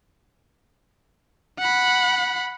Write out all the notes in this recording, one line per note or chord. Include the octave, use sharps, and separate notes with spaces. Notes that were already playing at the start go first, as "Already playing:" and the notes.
F#5 B5